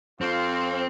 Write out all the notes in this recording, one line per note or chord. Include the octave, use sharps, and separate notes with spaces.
F2 C4 F4